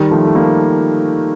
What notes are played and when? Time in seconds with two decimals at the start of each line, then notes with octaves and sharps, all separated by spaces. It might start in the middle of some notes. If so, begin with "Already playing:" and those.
Already playing: D#3 G3
0.11 F3 A3
0.25 A3
0.35 G3 A#3